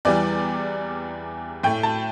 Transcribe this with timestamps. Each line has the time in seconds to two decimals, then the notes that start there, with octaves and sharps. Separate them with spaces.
0.05 E2 E3 G3 D5
1.63 A2 A3 G5
1.83 A5